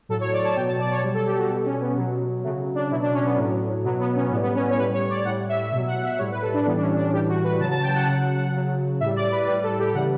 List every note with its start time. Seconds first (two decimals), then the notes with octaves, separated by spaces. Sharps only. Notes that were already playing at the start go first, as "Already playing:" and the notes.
0.09 A2 F#3 A4
0.21 C#5
0.33 D5
0.45 A5
0.56 B2 G5
0.59 F#3
0.68 A5
0.80 D5
0.91 C#5
1.03 B2 G3
1.14 A4
1.26 G4
1.38 F#4
1.50 B2 G3
1.66 C#4
1.81 B3
1.97 B2 F#3
2.44 C#3 F#3 A3
2.75 D4
2.91 B2 F#3 E4
3.02 D4
3.14 C#4
3.25 B3
3.37 A2 F#3
3.84 B2 F#3 B3
4.00 B3
4.16 C#4
4.31 A2 B3
4.34 G3
4.43 B3
4.55 C#4
4.70 C#5
4.78 A2 G3 B4
4.93 C#5
5.10 D5
5.25 A2 G3 F#5
5.49 E5
5.60 E5
5.72 B2 E5
5.76 F#3
5.88 F#5
6.03 E5
6.18 A2 G3 C#5
6.31 B4
6.42 A4
6.54 D4
6.66 A2 E3 G3 B3
6.77 D4
6.81 C#4
6.97 D4
7.12 A2 E3 G3 G4
7.28 F#4
7.44 B4
7.59 C#3 F#3 A5
7.71 A5
7.83 G5
7.95 F#5
8.07 C#3 F#3
8.53 C#3 F#3
9.00 A2 G3 E5
9.16 D5
9.32 B4
9.47 A2 G3 B4
9.63 A4
9.79 G4
9.94 C#3 E3 G3 F#5